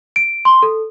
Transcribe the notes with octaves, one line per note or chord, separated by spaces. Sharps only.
D7
C6
A4